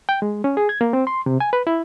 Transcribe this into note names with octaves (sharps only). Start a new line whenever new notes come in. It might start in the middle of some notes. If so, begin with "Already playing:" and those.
G5
G#3
C#4
G#4
G#6
A#3
C4
C6
C3
G#5
B4
E4